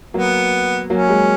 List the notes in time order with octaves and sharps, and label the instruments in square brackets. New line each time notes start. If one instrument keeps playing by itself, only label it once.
[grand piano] F#3 A#3 [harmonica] B3
[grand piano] F#3 A#3 [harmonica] C#4
[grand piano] G#3